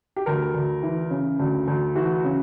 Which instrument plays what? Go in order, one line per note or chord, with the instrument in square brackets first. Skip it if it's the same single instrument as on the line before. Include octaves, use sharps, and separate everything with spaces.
[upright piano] G4
D2 A#4
D2
E3
C#3
D2
D2
E3 F#4
C#3